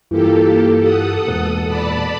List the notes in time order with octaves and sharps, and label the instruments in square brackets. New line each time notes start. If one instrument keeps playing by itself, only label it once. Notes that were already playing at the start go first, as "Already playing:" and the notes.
[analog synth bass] G2 [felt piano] E3 F4 [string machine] A#3 G4 A4
[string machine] A4 F#5 D#6
[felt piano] E1 [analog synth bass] A#2
[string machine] D5 A5 B5